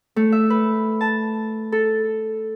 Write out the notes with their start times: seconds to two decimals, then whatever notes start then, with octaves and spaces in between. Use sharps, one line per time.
0.16 A3
0.32 E5
0.50 B4
1.01 A5
1.72 A4